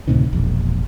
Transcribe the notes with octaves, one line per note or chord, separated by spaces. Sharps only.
D2 A2 C3 D#3
E1 A#1